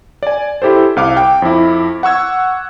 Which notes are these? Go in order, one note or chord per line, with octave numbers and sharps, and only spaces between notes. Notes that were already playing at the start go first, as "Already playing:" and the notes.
D5 G#5
E4 G4 A4 C5
C2 F5 D6
G5
F2 E4
F#5 C#6 E6 G#6